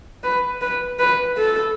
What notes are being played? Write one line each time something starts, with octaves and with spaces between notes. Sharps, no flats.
B4
B4
B4
A4